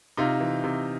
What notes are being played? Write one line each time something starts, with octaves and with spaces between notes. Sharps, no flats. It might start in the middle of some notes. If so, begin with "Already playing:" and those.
C3 D#4 F4
E3
C3